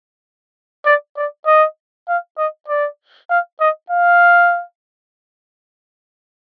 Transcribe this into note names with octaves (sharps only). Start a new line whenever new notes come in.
D5
D5
D#5
F5
D#5
D5
F5
D#5
F5